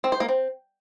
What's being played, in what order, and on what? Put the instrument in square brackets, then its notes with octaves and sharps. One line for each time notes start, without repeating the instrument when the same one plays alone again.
[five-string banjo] C4
C5
A#3
C4